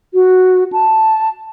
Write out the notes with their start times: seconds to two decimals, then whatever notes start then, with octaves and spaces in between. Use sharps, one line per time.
0.14 F#4
0.73 A5